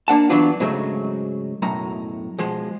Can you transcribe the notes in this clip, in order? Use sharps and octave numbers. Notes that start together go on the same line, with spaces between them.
A#3 D4 F#5 A5
E3 F#3 B3 D4 F4
G#2 C#3 F#3 G#3 A3
B1 F#2 A2 A#5
B1 F3 G#3